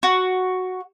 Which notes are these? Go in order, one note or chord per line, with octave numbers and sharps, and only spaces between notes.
F#4